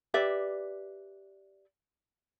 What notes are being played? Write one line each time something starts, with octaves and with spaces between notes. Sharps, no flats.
G4 B4 D5 E5